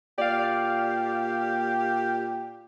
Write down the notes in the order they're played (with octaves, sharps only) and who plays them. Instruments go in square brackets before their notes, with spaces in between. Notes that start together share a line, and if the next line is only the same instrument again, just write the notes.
[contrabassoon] A#2 [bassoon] G4 [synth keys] D5 F5